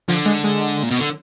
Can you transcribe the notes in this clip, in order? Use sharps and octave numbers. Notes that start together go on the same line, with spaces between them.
D3 F3
G#3
G#3
A#2
B2
D3